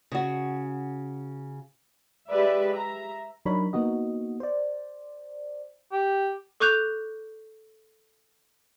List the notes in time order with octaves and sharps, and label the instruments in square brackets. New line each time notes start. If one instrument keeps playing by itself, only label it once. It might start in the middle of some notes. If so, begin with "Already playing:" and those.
[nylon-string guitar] C#3 F#4
[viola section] G#3 G4 B4 D5 E5
E5 A#5
[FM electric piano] F#3 D4 D#4 A#4 C#5 B5
A#3 B3 D#4 F#4 D#5
C5 D5
[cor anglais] G4
[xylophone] A4 C#6 D6 F#6 G6 F7